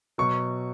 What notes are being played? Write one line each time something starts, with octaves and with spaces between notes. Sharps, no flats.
B2 F#3 C#6